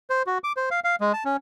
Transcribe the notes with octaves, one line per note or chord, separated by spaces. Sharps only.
C5
F#4
D6
C5
F5
F5
G#3
A5
C#4